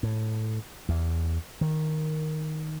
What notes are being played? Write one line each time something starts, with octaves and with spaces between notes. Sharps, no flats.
A2
E2
D#3